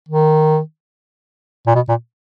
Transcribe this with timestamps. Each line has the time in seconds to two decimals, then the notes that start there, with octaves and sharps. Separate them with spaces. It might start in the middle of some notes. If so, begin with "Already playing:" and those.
0.09 D#3
1.67 A#2
1.75 B2
1.89 A#2